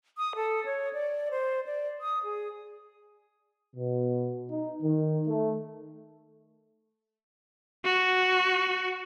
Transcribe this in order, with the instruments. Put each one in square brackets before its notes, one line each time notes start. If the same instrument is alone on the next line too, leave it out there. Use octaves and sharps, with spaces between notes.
[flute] D#6
A4
C#5
D5
C5
D5
D#6
G#4
[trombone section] B2
D#4
D#3
A3
[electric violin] F#4